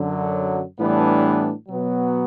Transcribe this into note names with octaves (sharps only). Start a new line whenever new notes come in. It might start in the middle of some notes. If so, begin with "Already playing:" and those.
Already playing: F#2 D3 F#3
A2 E3 G3 B3 D4
B2 F#3 B3